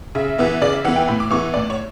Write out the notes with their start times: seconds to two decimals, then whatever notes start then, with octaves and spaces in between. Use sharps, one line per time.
0.15 C#3 E5
0.38 E3 B3 E5
0.61 C#3 D5
0.73 E5
0.85 E3 B3 F#5
0.96 G5
1.07 A2 B5
1.20 D6
1.31 E3 B3 C#6
1.54 A2 D5
1.70 C#5